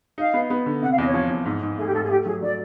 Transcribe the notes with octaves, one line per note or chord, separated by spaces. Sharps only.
D#4 F5
B3
B3
D3
C3 F#5
F5
E2 D#5
C#5
F3
E2
G#2
G#2
A3 G#4
G4
G#2 A4
G#4
A3 G4
F#3 G#4
F#3 D5